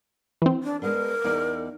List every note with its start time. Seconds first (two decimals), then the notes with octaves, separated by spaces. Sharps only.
0.42 E3 C4
0.64 D4
0.82 G#3 B3 D4 A#4
1.24 E2 D#4 D5